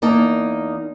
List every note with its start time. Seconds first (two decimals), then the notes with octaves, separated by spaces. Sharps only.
0.02 E2 A#3 D#4 A5